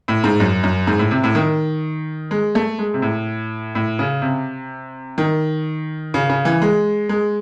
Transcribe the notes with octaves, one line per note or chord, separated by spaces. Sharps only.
A2
G#2
F#2
F#2
G#2
A2
C3
A2
D#3
G#3
A3
G#3
C3
A2
A2
C#3
C3
D#3
C#3
C#3
E3
G#3
G#3